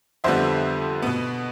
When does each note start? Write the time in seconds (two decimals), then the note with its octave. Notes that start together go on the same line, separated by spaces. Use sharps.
0.24 F2 D3 G3 B3 C5 E5
1.02 B2 B3